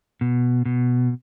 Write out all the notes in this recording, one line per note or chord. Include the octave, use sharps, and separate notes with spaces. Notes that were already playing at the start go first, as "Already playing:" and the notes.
B2
B2